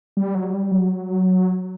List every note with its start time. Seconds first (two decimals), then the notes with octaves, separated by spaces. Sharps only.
0.17 G3
0.35 F#3
0.54 G3
0.71 F#3